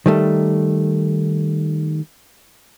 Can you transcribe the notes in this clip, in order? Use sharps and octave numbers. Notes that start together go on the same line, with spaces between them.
D#3 G3 A3